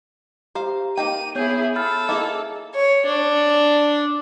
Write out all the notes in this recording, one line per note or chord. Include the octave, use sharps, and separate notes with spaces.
G4 C5 F5 A#5
A#3 D#4 G5 A#5 D#7
B3 E4 G#4 C#5 G6
F4 A4 B5 F6 A6
A#3 C#4 E4 G#4 D#5
C#5
D4